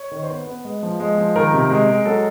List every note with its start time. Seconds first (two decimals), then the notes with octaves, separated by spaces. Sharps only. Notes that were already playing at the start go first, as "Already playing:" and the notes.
Already playing: C#5
0.11 D#3
0.23 C5
0.29 B3 B4
0.47 B3
0.65 G#3
0.83 F3
1.00 G#3
1.18 F3
1.36 D#3 A#4
1.53 C3
1.70 G#3
1.89 G#3
2.05 F#3 A4